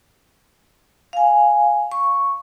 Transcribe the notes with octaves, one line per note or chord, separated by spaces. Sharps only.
F5 G#5
C#6